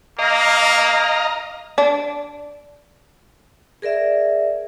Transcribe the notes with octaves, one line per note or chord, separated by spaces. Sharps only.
A#3 D#5 F5 A#5
D4
G#4 A#4 D5 E5